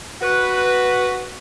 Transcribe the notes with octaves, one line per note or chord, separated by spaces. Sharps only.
F#4 B4